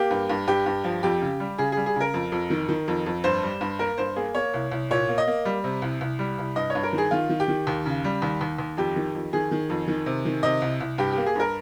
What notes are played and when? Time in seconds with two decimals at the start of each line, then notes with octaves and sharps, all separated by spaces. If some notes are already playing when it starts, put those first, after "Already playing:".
Already playing: A#3 G4
0.11 G2
0.29 G2
0.48 G2 G4
0.66 G2
0.84 F3
1.03 F2 G4
1.22 C#3
1.40 G3
1.58 C#3 G#4
1.72 G3 G#4
1.86 G#4
1.96 C#3 A#4
2.14 F2
2.32 F2
2.50 D#3
2.69 D#3
2.88 F2
3.06 F2
3.24 G2 C5
3.43 G3
3.61 G2
3.79 A#3 A#4
3.98 G2 C5
4.16 A#3 G#4
4.35 A#3 C#5
4.54 C2
4.72 C2
4.91 A#2 C#5
5.09 A#3
5.18 D#5
5.27 A#3
5.45 G3
5.64 C3
5.82 C2
6.01 C2
6.19 G3
6.38 C2
6.56 G2 D#5
6.70 C#5
6.75 G2
6.83 A#4
6.93 D#3
6.98 G#4
7.11 D#3 F4
7.29 D#3
7.40 G4
7.48 D#3
7.67 D#2
7.86 C#3
8.04 G3
8.22 D#2
8.41 D#2
8.58 D#2
8.77 F2 G4
8.96 D#3
9.15 F2
9.33 D#3 G#4
9.51 D#3
9.70 F2
9.88 D#3
10.06 C3
10.25 D#3
10.43 C3 D#5
10.62 C2
10.81 C2
10.98 G2 G4
11.12 G4
11.18 A#3
11.26 G#4
11.35 G2 A#4